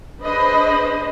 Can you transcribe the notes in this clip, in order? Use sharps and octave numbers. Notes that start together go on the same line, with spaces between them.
D4 G#4 B4 C5 D#5 B5